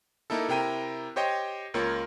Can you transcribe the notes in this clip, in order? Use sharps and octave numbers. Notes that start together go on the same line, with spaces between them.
A#3 D#4 E4 A4
C3 E4 A#4 G5 A#5 D#7
G4 C5 C#5 D#5 G5
C#2 A#3 F4 A#4 C#5 G#6